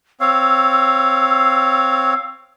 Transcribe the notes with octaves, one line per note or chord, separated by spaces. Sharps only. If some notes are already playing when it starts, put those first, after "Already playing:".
C4 C#5 F5 E6